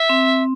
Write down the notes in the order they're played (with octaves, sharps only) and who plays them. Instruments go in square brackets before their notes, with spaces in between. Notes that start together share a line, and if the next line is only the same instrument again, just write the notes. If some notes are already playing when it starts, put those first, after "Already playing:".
Already playing: [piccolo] E5
[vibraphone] C4